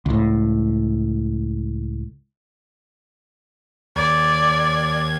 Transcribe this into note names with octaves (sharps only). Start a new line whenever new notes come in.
C#2 A2
D#2 D5 G#6